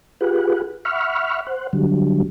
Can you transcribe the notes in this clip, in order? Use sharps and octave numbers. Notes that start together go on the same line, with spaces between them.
F4 G4 G#4 B4 F#5
E5 F#5 B5 C#6 F6
C5 F#5
D3 F#3 G3